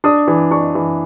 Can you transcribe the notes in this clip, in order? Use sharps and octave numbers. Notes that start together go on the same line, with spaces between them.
D4 D#6
E3
D4 C#6
E3